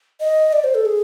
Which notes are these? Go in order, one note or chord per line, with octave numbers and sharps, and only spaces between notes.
D#5
D5
C5
A4
G#4